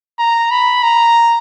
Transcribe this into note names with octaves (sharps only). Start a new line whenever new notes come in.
A#5
B5
A#5